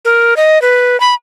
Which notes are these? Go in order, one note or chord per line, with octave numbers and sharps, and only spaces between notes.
A#4
D#5
B4
B5